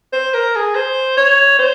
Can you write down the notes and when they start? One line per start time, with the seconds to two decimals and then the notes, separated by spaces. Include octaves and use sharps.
0.13 C5
0.34 A#4
0.56 G#4
0.75 C5
1.17 C#5
1.59 C5